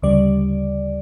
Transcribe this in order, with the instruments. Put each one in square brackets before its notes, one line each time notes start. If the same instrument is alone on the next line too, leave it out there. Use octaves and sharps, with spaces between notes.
[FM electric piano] D2 C#3 G3 D5